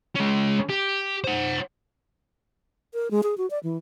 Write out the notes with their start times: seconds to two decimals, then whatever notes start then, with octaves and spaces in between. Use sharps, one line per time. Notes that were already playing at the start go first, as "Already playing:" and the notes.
0.16 G#3 C#4
0.70 G4
1.24 C5 F#5
2.94 A#4
3.11 G#3
3.23 G#4
3.38 F#4
3.50 D5
3.63 E3